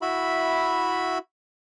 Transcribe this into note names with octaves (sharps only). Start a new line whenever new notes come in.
E4 F#4 E5 B5